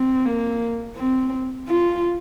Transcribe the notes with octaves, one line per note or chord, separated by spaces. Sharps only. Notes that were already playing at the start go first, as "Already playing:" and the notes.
Already playing: C4
A#3
C4
F4